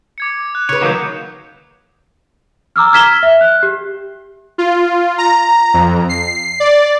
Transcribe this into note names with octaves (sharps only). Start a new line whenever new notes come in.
D6 G#6 C#7
F#6
C#3 B4 C#5
D#3 F#3 A#3 D6 D#6 G6
A#5 D6 E6 F6
F6 G#6 B6 E7 G7
E5
F#6
G4
F4
A#5
F2
C7
D5